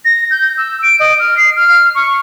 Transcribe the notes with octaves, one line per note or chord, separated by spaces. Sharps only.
A#6
G6
E6
D7
D#5
F6
C7
F6
C#6